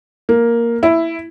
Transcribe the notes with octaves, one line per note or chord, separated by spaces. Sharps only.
A#3
E4